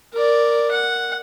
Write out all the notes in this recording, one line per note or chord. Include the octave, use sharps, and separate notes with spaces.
A#4 D5
F#5